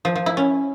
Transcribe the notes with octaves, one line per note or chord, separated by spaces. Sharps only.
F3
F3
E4
C#4